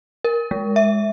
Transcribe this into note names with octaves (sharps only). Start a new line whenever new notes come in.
A#4
G#3
E5